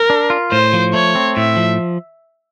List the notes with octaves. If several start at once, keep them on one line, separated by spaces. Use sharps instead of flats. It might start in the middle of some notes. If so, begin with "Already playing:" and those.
Already playing: A#4
D4
F4
A2 C5
F3
A3 C#5
C4
A2 E5
F3